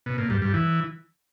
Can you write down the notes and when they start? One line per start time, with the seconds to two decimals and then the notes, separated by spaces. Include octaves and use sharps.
0.06 B2
0.18 A#2
0.30 G2
0.42 G2
0.54 E3